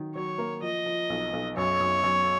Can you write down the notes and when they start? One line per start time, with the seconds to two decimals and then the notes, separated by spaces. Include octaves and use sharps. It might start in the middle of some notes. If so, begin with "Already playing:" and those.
Already playing: D#3 F#3
0.15 F#3 C#5
0.38 A#3
0.62 F3 D#5
0.86 F3
1.10 B1
1.33 B1
1.57 F#2 C#5
1.81 F#2
2.04 F#2